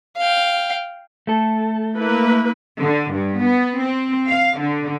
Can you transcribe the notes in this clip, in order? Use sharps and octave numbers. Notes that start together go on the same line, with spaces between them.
F5 G5
A3 A4
A#3 E4 B4
D3
G2
B3
C4
F5
D3